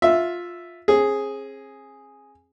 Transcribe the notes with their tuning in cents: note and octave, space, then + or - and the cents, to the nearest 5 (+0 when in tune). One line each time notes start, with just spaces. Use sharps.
F4 +10 E5 +0
C4 +40 G#4 +0